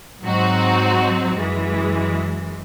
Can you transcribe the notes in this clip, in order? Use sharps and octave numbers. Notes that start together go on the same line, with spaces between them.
G#2 F#3 C4 D#4 F#4
F#2 E3 G#3